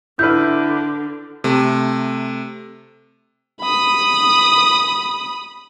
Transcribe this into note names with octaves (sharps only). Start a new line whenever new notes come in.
D3 E4 B4 F6 G6
C3 A3
B5 D#6